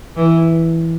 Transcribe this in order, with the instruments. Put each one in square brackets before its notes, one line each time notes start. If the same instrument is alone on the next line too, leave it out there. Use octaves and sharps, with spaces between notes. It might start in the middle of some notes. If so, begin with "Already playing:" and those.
[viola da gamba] E3